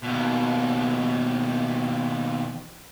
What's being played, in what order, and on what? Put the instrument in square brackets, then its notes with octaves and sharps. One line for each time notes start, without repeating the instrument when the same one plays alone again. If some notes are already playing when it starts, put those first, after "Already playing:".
[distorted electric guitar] D#2 B2